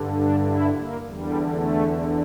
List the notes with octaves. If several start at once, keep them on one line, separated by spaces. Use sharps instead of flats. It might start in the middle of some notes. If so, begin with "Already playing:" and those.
Already playing: G2 D3
D4
E4
A#3
E2 D3 G3
A3